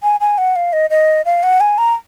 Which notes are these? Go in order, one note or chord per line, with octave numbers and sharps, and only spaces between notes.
G#5
G#5
F#5
F5
D#5
D#5
F5
F#5
G#5
A#5